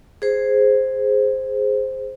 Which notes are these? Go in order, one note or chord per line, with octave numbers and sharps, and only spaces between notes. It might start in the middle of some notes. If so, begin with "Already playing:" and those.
G#4 C5